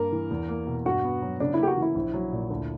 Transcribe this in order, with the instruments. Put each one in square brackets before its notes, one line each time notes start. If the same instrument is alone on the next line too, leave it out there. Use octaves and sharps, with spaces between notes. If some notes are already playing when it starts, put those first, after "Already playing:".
Already playing: [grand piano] G2 A#3 [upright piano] A#4
[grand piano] E3
E2
A#3
B2
[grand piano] G2 [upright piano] F#4
[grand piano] B3
F#3
[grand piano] C#3 [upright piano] D4
[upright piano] E4
[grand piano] A#3 [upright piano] G4
[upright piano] F#4
[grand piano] E3 [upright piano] E4
[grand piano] A#1
F#3
A#2
D2